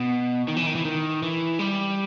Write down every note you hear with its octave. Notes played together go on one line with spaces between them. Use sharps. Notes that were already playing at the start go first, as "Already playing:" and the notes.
Already playing: B2
D#3
E3
D#3
E3
D#3
E3
G3